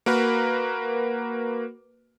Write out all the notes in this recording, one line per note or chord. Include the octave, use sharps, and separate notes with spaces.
A#3 F#4 A#4 B4